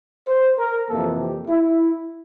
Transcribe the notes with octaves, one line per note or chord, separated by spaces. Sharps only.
C5
A#4
F2 C3 E3 A#3 A4
G4
E4